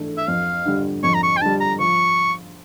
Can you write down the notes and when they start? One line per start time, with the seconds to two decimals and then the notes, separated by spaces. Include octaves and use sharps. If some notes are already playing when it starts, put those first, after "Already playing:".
Already playing: E3 A3 D4 A4
0.18 E5
0.28 F2 F5
0.66 D3 G3
1.03 F2 C#6
1.14 A#5
1.23 C#6
1.37 G5
1.41 D3 G3 A5
1.60 A#5
1.79 F3 C#6